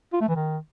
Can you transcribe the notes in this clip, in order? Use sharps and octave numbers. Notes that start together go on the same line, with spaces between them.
F4
A3
E3
D#3